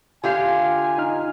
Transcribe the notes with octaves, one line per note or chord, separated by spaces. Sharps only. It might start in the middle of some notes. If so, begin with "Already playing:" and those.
D3 F4 G4 E5 F5 G#5
D#4 F6